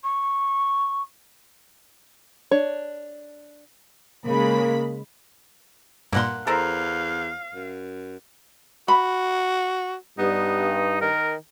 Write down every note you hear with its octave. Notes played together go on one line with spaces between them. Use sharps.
C#6
D4 C#5
C#3 G#3 A#3 B5
G2 A#2 A#3 F#5 C6
E2 A4 A#4 C5 F5
F#2
F#4 B5
G2 B3 D#4
D#3 A#4